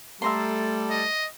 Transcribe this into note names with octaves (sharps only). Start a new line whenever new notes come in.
G3 A3 A4 E5 A#5 C6
D#5